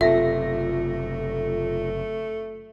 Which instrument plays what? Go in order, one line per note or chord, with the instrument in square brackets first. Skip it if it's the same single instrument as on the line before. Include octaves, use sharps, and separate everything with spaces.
[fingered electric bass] F#1 C3 [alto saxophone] A3 [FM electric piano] F4 A4 A#6 [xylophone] E5